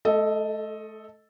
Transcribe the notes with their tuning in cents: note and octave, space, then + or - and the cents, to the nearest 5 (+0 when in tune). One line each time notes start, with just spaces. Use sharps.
A3 -35 A4 +0 D#5 +5